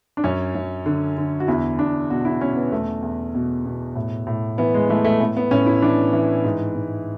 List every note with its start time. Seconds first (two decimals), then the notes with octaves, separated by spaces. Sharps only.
0.17 D4
0.24 F#2 C#4
0.55 F#2
0.86 D3
1.17 D3
1.40 F#4
1.48 E2 E4
1.79 E2 D4
2.10 B2 F#4
2.25 E4
2.40 B2 C#4
2.56 B3
2.72 E2 A3
3.02 E2
3.35 B2
3.66 B2
3.96 A2
4.27 A2
4.58 E3 B3
4.74 G#3
4.89 E3 A3
5.05 A3
5.20 A2 B3
5.37 B3
5.51 A2 C#4
5.66 E4
5.82 E3 D4
6.13 E3
6.44 G#2
6.76 G#2